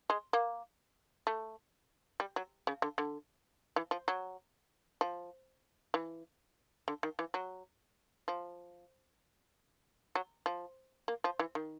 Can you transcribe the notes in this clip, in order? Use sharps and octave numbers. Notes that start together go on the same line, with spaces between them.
G#3
A#3
A3
G3
F#3
C#3
D3
D3
E3
F3
F#3
F3
E3
D3
D#3
E3
F#3
F3
F#3
F3
A#3
F3
E3
D#3